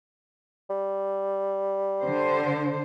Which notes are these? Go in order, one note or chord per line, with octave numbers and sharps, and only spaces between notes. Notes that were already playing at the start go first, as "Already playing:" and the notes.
G3
D3 C5